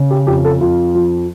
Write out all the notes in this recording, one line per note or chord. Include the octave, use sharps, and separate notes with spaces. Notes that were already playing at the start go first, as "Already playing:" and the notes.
Already playing: C#3
G4
F2 G4
A4
F2 F4
F3